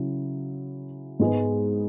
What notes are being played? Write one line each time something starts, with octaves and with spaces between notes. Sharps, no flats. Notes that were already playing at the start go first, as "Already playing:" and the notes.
Already playing: C#3 F#3 E4
G#2 G#3 B3